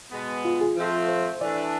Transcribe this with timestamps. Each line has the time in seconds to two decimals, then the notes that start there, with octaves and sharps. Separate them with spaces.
0.12 B2 G#3 B3
0.45 F4
0.61 G#4
0.76 F3 A3 C4
1.09 C5
1.41 E3 A3 D4 D5